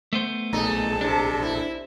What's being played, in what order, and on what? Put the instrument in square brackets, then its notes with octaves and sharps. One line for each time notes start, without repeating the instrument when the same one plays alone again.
[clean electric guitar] A3 B3 C5
[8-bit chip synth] A#1 A#2 A4 [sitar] D#4 [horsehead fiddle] G#4 A5
[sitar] C3 [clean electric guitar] D4
[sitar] E4